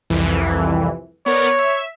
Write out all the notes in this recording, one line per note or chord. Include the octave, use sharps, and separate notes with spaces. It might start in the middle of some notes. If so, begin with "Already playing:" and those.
C2 F2 E3
B3 A#4 C#5 D5
E5